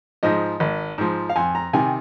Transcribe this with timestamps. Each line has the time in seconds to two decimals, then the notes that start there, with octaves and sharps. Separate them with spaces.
0.23 G#2 F3 D#5
0.60 G#1
0.98 G#2 F3
1.29 F5
1.36 F2 G#5
1.55 A#5
1.73 C3 D#3 G#5